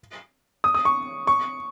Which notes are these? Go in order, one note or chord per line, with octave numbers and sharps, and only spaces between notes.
D#6
D#6
C#6
C#6